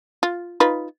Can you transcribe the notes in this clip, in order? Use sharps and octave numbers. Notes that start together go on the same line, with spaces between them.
F4
D#4 F4 B4